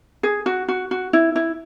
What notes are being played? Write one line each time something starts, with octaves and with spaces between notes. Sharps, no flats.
G#4
F#4
F#4
F#4
E4
E4